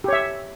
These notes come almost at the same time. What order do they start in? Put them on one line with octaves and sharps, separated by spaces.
G4 C#5 E5